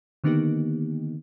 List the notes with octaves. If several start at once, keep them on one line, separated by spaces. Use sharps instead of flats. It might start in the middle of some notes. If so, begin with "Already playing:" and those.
D3 D#3 A#3 B3 D#4 G4